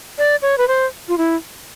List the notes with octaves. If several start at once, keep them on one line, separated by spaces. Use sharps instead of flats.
D5
C#5
B4
C5
F4
E4